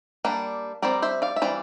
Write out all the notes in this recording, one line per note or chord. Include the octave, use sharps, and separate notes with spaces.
G3 A#3 D4
G3 C4 A#4 D5
C5 E5
D5 F5
E5
E3 G3 C4 D5 F5